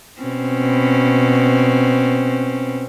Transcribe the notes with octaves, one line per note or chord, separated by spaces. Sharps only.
B2 C4 C#4